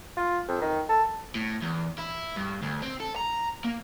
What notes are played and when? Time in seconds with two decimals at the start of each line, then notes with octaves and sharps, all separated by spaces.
0.17 F4
0.48 F2
0.61 D#3
0.89 A4
1.35 A2
1.62 E2
1.99 E4
2.37 G2
2.62 D2
2.82 C4
3.00 A4
3.16 A#5
3.65 A#3